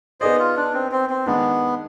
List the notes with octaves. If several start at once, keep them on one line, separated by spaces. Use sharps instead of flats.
B3 D#4 G#4 C5 D5 D#5
F4
D4
C4
C4
C4
D#3 G#3 B3 D4